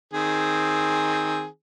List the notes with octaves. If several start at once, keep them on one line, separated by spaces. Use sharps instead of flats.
D#3 C4 G#4